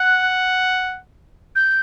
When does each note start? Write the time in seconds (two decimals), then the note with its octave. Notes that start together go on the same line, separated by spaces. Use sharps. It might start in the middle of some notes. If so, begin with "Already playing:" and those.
Already playing: F#5 F#6
1.56 G6